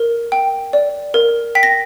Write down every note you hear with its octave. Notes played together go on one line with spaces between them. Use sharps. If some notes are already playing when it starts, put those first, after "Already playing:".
Already playing: A#4
G5
D5
A#4
G5 B6
A#6